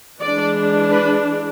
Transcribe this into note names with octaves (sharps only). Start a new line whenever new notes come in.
E3 G#3 D4 D5
B4